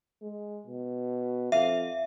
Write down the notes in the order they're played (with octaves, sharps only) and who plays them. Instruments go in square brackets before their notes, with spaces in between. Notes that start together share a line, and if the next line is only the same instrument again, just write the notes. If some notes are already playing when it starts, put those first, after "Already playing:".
[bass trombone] G#3
B2
[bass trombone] F2 [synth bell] E5 [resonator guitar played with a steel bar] F5